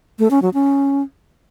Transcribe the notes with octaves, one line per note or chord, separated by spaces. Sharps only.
A3
C#4
F#3
C#4